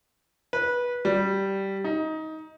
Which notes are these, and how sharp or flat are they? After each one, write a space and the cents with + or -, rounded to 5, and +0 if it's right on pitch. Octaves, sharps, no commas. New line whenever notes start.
B4 -20
G3 -10
D#4 +20